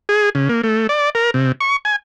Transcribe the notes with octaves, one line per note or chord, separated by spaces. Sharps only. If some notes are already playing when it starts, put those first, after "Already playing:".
G#4
C#3
A#3
A3
D5
A#4
C3
C#6
G#5